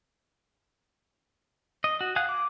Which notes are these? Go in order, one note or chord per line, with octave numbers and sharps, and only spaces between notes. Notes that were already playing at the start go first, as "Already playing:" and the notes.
D#5
F#4
G#4 F5 F#5 F#6
D6